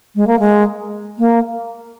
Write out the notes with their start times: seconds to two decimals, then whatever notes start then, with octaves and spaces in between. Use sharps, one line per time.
0.16 G#3
0.27 A#3
0.40 G#3
1.19 A#3